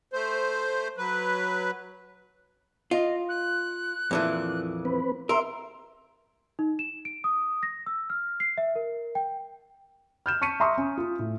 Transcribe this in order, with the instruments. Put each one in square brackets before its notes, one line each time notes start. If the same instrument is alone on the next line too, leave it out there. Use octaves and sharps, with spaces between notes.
[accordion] A3 C5
F#3 B4
[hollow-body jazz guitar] F4 [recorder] D#5
[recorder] F#6
[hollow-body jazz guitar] F2 A#2 E3
[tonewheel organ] C4 B4
[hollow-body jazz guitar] A#4 [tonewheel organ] E5 [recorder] C6
[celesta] D#4
E7
D7
D#6
A#6
E6
F6
C7
E5
A#4
G5
[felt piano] F6 G6 E7
A5 C#6 B6 C#7 D#7
E5 A#5 C6 C#6 D#6
C#4
F4
A2